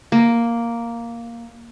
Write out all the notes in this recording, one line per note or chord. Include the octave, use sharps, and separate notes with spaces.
A#3